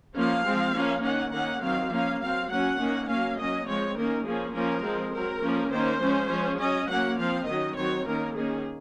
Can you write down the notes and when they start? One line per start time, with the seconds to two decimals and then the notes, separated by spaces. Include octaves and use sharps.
0.15 F3 A#3 C#4 F5
0.44 F3 G#3 C4
0.74 F3 A#3 C#4
1.03 D#3 A#3 C#4 F#5
1.32 D#3 A#3 C#4 F#5
1.61 D#3 F#3 C4 F5
1.90 F3 A#3 C#4 F5
2.20 F#3 C4 F5
2.49 F#3 A#3 C#4 F#5
2.79 D#3 A#3 C#4
3.07 F#3 A#3 C#4 F5
3.37 F#3 A#3 C#4 D#5
3.66 F3 G#3 C4 C#5
3.95 D#3 A#3 C#4 A#4
4.24 F3 A#3 C#4 G#4
4.53 F3 A#3 C#4 A#4
4.83 F3 G#3 C4
5.12 F#3 C4 A#4
5.41 F3 A#3 C#4
5.71 D#3 A#3 C#4 C5
6.00 F3 G#3 C#4
6.29 F3 G#3 C#4
6.59 F#3 C#4 D#5
6.88 F#3 A#3 C#4 F#5
7.17 F3 C4 F5
7.47 D#3 F#3 C#4 D#5
7.76 D#3 F#3 C4 C#5
8.05 D#3 A#3 C#4 A#4
8.34 D#3 A#3 C#4 G#4